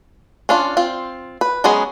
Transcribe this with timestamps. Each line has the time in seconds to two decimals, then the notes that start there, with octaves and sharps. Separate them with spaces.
0.49 C#4 D4 F4
0.77 C4 F4
1.41 B4
1.64 F#3 G#3 B3 C#4 G#4